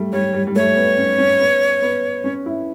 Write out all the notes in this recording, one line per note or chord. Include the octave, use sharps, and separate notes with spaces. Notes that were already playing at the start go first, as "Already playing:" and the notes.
Already playing: G3 A3
G3 C#5
G3
G3
A3 C#5
B3
C#4
C#4
B3
B3
C#4
E4